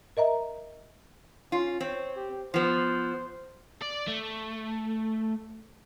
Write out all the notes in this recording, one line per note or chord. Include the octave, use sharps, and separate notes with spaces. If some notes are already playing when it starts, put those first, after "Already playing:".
A#4 D#5 E5 A#5
C#4 F4
C4 C#5
G4
F3 B3 C5
D5
A3